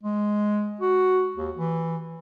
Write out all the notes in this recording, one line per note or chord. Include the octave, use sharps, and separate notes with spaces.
G#3
F#4
D#2
E3